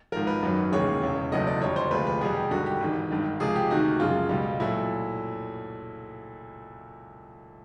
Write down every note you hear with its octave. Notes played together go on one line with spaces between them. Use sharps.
G#1 G#2 F3 A#4
B4
G#1 F#2 D#3 F#3
F1 D#2 C#3 E3 G#3 C#5
E1 E2 C#3
F#1 E2 B2 F#3 A3 D#5
D5
F2 D3 G3 C#5
C5
D2 C3 F3 G#3 B4
B4
E2 B2 G3 G#4
G4
G#1 G2 D3 G3 F#4
G4
G#1 G#2 E3
G#1 G2 D#3
C#2 C3 F3 G#3 G#4
G4
D2 C3 D#3 F#4
F#2 C#3 F3 G#3 F4
C#2 B2 G3
A#2 F#3 A3 E4